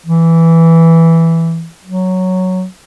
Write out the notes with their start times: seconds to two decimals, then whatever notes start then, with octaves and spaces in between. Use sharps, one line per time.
0.06 E3
1.85 F#3